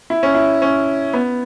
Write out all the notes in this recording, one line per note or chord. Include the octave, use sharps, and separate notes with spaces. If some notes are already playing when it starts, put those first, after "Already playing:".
E4
C#4
E4
C#4
B3